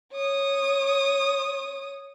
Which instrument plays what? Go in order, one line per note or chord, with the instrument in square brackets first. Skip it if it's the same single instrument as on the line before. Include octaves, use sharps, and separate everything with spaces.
[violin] C#5 D#6